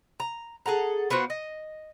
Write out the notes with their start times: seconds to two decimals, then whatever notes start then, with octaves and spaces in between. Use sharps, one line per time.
0.20 A#5
0.66 G#4 A4 F#5 A#5
1.10 B3 F4 F#4 C5
1.30 D#5